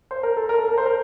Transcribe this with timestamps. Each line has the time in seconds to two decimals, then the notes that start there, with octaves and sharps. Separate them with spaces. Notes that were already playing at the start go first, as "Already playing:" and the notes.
0.11 C5
0.23 A#4
0.37 A4
0.49 A#4
0.59 A4
0.68 A#4
0.78 C5
0.86 A#4